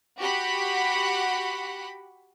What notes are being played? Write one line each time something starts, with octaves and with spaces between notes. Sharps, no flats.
F#4 G4 F#5 B5